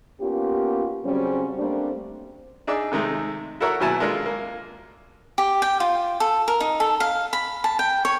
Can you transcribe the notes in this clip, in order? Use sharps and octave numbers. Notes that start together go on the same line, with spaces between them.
A#3 B3 C#4 F4 G4
C#3 F#3 G3 C4 C#4
G3 A3 A#3 C4 D4
D4 D#4 G#4 D5 E5 E6
C3 D#3 G#3 A3
E4 F#4 A4 A#4 C#5 E5
D#2 B2 F#3 E4 G#5 A5
G#3 A#3 D4 F4 A4
A#3
G4
G5
F4
A4
A#4
D#4
A4
F5
B5
A5
G5
C#5